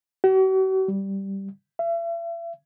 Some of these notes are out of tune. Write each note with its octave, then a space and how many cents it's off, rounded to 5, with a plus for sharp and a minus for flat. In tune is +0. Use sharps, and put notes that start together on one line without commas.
F#4 +45
G3 -5
E5 +40